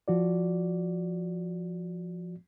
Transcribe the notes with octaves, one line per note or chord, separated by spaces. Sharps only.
F3 F#4 D5